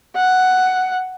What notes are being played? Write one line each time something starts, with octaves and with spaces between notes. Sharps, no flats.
F#5